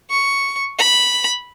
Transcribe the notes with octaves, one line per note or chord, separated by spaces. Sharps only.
C#6
B5